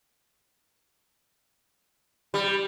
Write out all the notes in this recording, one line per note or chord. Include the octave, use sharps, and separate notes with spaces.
G3